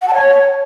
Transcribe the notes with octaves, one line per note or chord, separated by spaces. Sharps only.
F#5
A5
C#5